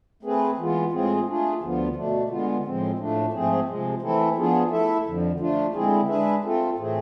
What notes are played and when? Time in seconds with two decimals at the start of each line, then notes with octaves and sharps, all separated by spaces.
0.23 A3 C4 G#4 B4
0.58 E3 G#3 B3 F4
0.92 A2 G#3 C4 F4 G#4
1.27 A3 D4 F4 G#4
1.61 D2 D3 F3 B3 F4
1.95 B2 A3 D4
2.30 D3 G#3 B3 F4
2.64 A2 F3 G#3 C4
2.98 A2 F3 A3 D4
3.33 G#2 F3 A3 C4 G#4
3.67 C3 F3 G#3
4.02 E3 A3 C4 E4 A4
4.36 F3 B3 D4 F4 G#4
4.71 A3 E4 A4 E5
5.05 F2 D3 F3
5.40 F3 A3 D4 F4
5.74 D3 G#3 C4 E4 G#4
6.08 G#3 D4 G#4 B4 E5
6.42 A3 C4 F4 A4
6.77 A2 E3 A3 C4 G#4